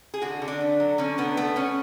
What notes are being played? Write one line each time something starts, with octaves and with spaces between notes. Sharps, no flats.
G#4
D3 F#4
D3
D4
A3
F#3
D3 C#4
D3 B3
A3 B3
A3 C#4